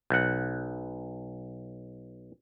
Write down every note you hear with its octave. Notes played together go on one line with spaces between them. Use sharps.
B1 F#5